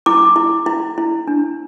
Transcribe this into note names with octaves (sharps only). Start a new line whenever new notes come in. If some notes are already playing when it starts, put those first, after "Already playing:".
E4 D6
E4
E4
E4
D4